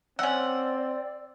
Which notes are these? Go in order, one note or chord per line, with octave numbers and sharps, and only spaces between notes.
C4 C#4 D5 F#5 E6